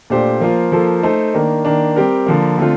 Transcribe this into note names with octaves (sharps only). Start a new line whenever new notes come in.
A#2 A3 D4 G4 C5
F3 A#3 F4 C5
F3 A#3 F4 A4 C5
A3 D#4 A4 C5
D#3 A#3 D4
D#3 A#3 D4
G3 C4 G4 A#4
D3 F3 A#3
D3 A3 C4 F4